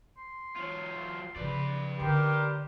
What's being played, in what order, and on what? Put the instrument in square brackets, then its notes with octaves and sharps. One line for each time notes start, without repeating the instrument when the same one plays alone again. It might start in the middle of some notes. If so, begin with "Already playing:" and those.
[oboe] C6
[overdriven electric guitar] F#3 F4
[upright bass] C#3 F3 [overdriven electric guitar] B4 D5
[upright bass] D3 D#4 [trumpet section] G4 A#4 [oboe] C6